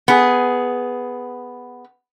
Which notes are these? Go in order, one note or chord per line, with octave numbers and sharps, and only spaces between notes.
B3 G#4